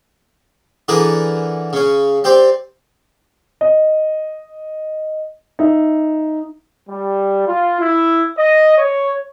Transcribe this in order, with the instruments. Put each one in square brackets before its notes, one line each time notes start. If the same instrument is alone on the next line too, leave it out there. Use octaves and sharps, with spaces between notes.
[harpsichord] D3 E3 G#4 A#4 B4 D5
C#3 C#4
C4 G4 C5 D5
[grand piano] D#5
D#4 E5
[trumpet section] G3
F4
E4
D#5
C#5